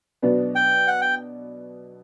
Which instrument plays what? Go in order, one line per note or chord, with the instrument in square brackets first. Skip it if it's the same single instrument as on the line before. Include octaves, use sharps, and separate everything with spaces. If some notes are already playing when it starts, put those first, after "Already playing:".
[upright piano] B2 F#3 B3 D4
[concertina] G5
F#5
G5